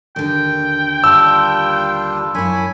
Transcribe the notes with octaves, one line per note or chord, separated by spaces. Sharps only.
D#2 D3 G5
G3 D4 F4 E6
F#2 E4 C#5 G#5 B5